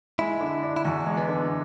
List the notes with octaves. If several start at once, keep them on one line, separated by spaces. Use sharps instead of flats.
G#3 E4
D3
D4
E4
E2 F#4
G#3
B3
D3